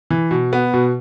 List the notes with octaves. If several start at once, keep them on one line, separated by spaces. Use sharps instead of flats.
E3
B2
B3
B2